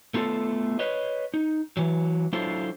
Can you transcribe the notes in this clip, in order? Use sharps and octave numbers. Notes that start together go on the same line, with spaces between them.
A3 B3 F4 G4 A4
B4 C#5 D#5
D#4
E3 F#3
F#3 D4 E4 F4 A4 C5